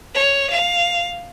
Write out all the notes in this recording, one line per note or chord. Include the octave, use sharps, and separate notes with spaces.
C#5
F5